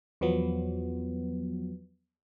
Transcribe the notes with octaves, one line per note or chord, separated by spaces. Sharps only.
E2 F3 F#3 B3